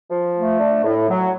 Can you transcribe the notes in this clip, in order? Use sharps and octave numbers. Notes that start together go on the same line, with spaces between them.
F3
A3
D4
A2
F#3